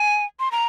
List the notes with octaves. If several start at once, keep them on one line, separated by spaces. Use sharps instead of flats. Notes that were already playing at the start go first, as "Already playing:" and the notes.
Already playing: G#5
C6
A#5